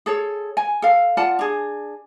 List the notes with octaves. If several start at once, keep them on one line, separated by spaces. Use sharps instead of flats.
G#4 A4 C#5
G#5
A4 F5
F4 D5 F#5 A5
D4 G#4